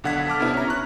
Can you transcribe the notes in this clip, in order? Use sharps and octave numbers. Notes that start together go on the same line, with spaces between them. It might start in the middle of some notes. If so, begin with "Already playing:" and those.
B1 D3 F#5 G#6 B6
A4 A5 D6 F6
C3 B3 D4 E4
C#4 A#5
C#6 F#6